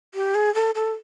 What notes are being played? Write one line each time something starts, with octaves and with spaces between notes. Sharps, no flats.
G4
G#4
A4
A4